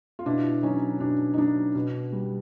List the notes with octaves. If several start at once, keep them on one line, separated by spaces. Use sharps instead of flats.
F4
B2 D4 E4
F#3 C#4 D#4
B2 D4
D#4
F#3 D4
B2
G3